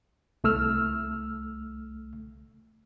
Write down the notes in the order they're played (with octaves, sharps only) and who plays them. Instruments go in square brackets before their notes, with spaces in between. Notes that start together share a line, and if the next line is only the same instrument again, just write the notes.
[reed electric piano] C2 A3 E6 F6